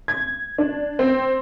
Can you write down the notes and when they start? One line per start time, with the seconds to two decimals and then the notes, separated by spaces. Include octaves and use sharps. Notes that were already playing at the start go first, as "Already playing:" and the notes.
0.08 G#6
0.58 D4
0.99 C4